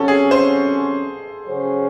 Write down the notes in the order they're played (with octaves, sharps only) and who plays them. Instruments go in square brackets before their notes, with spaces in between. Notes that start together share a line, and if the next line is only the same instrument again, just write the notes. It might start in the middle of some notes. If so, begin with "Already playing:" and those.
Already playing: [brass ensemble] C3 F#3 C#4 [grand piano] A4
[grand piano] G#4
C5
[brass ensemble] C#3 F#3 C#4 G#4 C5